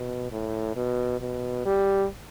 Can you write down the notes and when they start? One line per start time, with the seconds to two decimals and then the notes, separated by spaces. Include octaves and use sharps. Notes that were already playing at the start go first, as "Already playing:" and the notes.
Already playing: B2
0.32 A2
0.76 B2
1.21 B2
1.66 G3